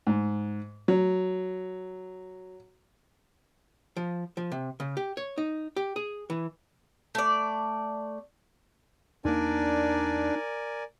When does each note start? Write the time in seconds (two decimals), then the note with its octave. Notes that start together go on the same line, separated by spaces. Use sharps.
0.07 G#2
0.88 F#3
3.97 F3
4.37 F3
4.52 C3
4.80 C#3
4.97 G4
5.17 C#5
5.38 D#4
5.76 G4
5.96 G#4
6.30 E3
7.15 A3 D5
9.25 E2 A#3 D4 D#4 A#4 D5 G#5